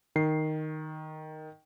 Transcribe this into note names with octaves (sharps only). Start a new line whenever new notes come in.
D#3 C7